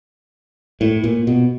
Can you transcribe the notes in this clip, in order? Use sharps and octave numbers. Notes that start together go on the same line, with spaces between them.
A2
A#2
B2